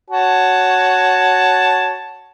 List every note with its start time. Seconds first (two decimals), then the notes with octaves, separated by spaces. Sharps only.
0.10 F#4 C#5 A5